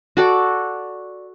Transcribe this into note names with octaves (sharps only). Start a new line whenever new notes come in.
F#4 A4 D5